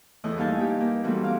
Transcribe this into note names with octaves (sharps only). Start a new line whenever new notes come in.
E2 E3 A3 E4 D#5 D#6
G2 A#3 D#4 F5 G#5 A5
A#3 G4
A#3
E3 F#3 G3 A3 B3 C4
F5 D6